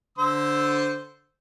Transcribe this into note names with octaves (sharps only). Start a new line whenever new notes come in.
D3 C5 E6